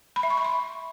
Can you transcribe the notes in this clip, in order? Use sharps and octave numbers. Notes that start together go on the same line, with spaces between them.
B5
E5
C#6
B5
C6